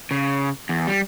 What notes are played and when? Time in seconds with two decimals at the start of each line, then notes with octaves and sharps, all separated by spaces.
0.11 C#3
0.69 E2
0.87 G3